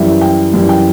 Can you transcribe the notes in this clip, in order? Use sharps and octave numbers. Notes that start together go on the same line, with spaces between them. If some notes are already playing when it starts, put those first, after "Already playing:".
Already playing: F#2 E3 G3 E5
G5
F#2 E3 G3
G5